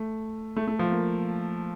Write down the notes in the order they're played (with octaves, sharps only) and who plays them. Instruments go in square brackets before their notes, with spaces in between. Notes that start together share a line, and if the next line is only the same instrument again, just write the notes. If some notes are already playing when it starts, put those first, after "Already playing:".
Already playing: [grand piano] A3
A3
A3
F3
A#3